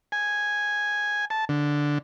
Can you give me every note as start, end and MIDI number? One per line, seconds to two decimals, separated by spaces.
0.12 1.25 80
1.30 1.45 81
1.49 1.98 50